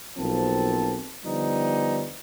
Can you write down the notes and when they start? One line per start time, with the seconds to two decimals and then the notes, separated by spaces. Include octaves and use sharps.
0.17 B1 F3 A#3 C4 A5
1.25 D3 F3 G3 B3 D#4